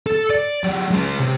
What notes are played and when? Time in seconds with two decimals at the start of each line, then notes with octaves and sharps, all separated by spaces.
0.07 A4
0.30 D5
0.64 F#3 G4
0.91 G#3 C#4
1.20 C3